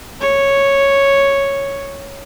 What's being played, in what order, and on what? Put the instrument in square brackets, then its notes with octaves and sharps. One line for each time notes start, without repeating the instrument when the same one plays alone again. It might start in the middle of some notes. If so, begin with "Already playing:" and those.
[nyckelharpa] C#5